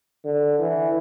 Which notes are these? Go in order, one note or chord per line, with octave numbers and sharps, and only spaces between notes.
D3
E3